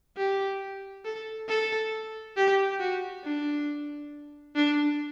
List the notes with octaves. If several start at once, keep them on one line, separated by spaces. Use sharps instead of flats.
G4
A4
A4
G4
F#4
D4
D4